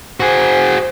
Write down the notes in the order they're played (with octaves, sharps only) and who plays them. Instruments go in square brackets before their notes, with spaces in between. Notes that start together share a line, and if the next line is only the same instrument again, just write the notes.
[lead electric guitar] F#4 G#4 [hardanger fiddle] C5